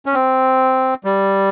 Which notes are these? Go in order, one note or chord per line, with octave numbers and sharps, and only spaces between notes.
C#4
C4
G3